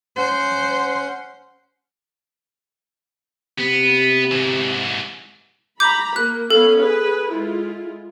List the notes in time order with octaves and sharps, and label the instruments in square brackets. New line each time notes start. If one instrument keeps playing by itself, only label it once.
[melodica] C#4 F#5 [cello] C5
[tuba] C3 [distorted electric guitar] B3
[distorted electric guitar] G#2 E3
[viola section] A#5 B5 [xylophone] D6 G6
[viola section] A#3 [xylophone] F#6
[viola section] B3 C#4 F5 [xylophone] A4
[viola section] G#4 B4
G#3 E4 F4